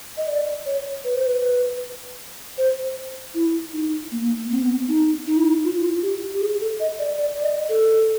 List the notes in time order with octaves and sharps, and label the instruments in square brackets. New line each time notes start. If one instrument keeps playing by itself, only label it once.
[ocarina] D#5
D5
C#5
B4
C5
B4
C5
E4
D#4
A#3
A#3
C4
B3
D#4
D#4
E4
D#4
F4
E4
F4
G4
G4
G#4
A4
D#5
D5
D5
D5
D#5
A4